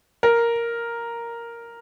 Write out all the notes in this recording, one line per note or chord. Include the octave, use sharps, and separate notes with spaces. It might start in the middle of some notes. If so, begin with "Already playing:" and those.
A#4